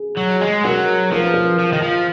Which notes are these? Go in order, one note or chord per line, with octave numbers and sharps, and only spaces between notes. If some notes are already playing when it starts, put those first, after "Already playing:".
Already playing: G#4
F#3
G#3
F#3 A#4
F3 A#4
B4
A#4
F3
D#3
F3